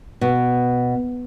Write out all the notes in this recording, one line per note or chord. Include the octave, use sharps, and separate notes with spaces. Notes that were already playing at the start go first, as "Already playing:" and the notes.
B2